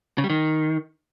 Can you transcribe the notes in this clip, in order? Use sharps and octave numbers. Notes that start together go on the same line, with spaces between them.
C#3
G3
D#3